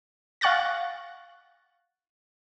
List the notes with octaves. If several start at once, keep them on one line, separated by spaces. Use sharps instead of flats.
F5 F#5 C#6 F#6 A6 A#6